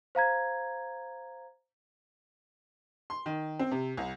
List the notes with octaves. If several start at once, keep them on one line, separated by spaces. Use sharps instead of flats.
C5 F5 A#5 G#6
C6
D#3
C4
C3
C2